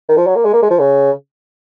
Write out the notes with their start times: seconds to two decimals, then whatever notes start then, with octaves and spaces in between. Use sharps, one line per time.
0.09 D#3
0.17 F3
0.27 F#3
0.36 A#3
0.45 G#3
0.54 A#3
0.62 G#3
0.71 F3
0.79 C#3